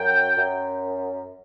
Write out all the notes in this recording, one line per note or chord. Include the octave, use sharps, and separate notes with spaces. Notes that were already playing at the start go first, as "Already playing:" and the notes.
Already playing: F#2 G5
F#2